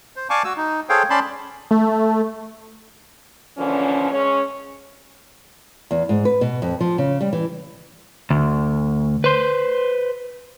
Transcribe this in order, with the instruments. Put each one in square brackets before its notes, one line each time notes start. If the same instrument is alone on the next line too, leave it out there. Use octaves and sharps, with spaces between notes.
[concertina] C5
D5 F5 G#5 A5 C#6 D6
F#4 E6
D#4
G#4 A4 C5 C#5 F5 G5
C#4 D5 A5 B5 C6
[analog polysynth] A3
[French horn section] A#2 D3 E3 F3 C#4
G#3 C#4 C#5
[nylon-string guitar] E2
G#2
B4
B2
F2
F3
C#3
G3
E3
[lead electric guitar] D2
B4 C5